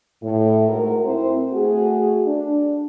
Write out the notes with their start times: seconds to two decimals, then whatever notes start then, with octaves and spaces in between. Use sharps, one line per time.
0.22 A2
0.69 G#2 A3 F#4 A#4
1.05 C4 E4 C5
1.52 A3 F#4 G#4
2.26 D4